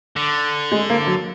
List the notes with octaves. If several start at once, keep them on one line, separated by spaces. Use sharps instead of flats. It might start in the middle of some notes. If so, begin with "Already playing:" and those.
D3
G#3
A#3
F#3